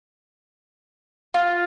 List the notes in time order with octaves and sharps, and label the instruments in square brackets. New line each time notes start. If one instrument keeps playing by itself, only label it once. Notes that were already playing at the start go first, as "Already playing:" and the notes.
[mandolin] F4